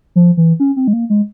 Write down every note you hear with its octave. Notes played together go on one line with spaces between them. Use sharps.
F3
E3
C#4
C4
G#3
A#3
G#3